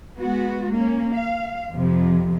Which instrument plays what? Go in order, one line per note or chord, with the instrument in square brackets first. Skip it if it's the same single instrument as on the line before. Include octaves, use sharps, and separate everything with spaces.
[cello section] G#3 B3 F#4
A#3 C#4
F5
F2 C3 F3